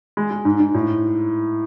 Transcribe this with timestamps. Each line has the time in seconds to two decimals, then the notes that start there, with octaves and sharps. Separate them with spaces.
0.17 G#3
0.31 G#3
0.45 G#2
0.60 G#2
0.74 A2